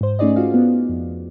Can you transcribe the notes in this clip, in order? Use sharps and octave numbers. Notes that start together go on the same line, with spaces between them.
G#2 C5
A3 C#4 D#4 G#4 D5 D#5
F4 F#4 F5
B3
F2